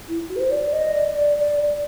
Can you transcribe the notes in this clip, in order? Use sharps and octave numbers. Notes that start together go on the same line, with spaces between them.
E4
F#4
B4
C5
D5
D#5
D5
D5